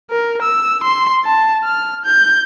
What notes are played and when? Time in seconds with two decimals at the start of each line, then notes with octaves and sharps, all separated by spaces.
0.11 A#4
0.42 E6
0.84 C6
1.25 A5
1.64 F6
2.06 G6